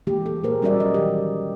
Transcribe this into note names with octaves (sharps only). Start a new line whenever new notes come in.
E3 G#3 A#3 G4
A#3 A4
A#2 A#3 G4 G#4 A#4 C5
G3 C#4 F#4 A#4 D5 E5
F#3 D#5
D#3 E3 G4